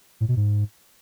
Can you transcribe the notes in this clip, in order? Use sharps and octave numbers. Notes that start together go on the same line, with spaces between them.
A2
B2
G#2